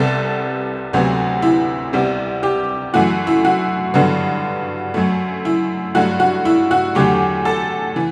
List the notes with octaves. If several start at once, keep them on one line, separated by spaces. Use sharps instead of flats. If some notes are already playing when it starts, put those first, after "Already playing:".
Already playing: C2 C3 G3 B3 A4
D2 C3 F#3 B3
E4
C2 C3 G3 B3
G4
F#2 E3 A3 F#4
E4
F#4
G2 D3 F#3 B3
F#2 F#3 A3
E4
G2 F#3 A3 F#4
F#4
E4
F#4
E2 D3 F#3 A3 G4
A4
E3